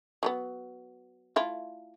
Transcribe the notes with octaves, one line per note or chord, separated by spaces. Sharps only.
F#3 A3 B3
A3 E4 F4